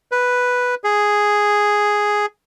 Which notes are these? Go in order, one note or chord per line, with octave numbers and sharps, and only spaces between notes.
B4
G#4